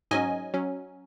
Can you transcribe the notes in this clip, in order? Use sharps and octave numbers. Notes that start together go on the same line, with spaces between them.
G#2 F#3 C#4 D#5 G#5
F#3 C#4